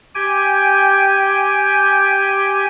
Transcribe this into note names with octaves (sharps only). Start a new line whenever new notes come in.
G4 G5 G#5